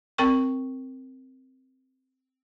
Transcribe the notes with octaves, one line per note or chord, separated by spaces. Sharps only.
C4 A#4 G5 C#6